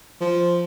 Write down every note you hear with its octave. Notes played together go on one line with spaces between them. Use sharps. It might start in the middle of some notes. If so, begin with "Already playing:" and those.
F3